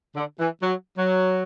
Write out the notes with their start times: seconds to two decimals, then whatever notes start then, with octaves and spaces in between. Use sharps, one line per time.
0.16 D3
0.39 E3
0.62 F#3
0.97 F#3